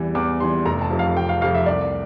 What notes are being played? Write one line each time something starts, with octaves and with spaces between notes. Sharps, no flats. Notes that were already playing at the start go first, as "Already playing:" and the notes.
Already playing: E2 E3 G3
E2 D6
E3 G3 C6
F1 A#5
A5
F2 C3 F3
F5
F1 G5
F5
F2 C3 F3 F5
E5
C2 D5